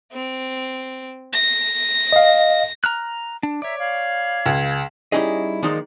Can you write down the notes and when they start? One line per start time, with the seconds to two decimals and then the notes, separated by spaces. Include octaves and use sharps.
0.13 C4
1.33 A#6
2.12 D#5 F5
2.84 A#5 F6 F#6
3.43 D4
3.62 C#5 D5 E5 A#5
3.79 F5 B5 G#6
4.46 C#2
5.12 G3 C#4 D#4 E4 G#4 D#5
5.63 D#3 F3 G#3 A#3 D#4 D5